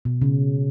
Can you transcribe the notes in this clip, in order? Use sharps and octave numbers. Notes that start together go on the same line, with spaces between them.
B2
C#3